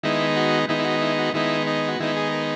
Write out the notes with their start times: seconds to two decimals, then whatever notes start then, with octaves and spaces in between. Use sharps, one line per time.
0.03 D#3 G#3 B3 D#4 E4
0.36 F#4
0.69 D#3 G#3 B3 D#4 E4
0.79 E4
0.85 F#4
1.02 E4
1.18 F#4
1.34 D#3 G#3 B3 D#4 E4
1.67 D#4
1.88 F#4
2.00 D#3 G#3 B3 D#4 E4
2.17 G#4
2.32 A#4